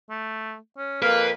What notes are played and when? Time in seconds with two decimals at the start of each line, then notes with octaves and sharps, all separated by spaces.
0.10 A3
0.77 C#4
1.02 F2 A#3 B4 F5